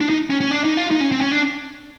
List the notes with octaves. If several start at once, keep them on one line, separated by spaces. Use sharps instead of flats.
D4
D#4
C#4
C#4
D4
D#4
F4
D#4
C#4
C4
C#4
D4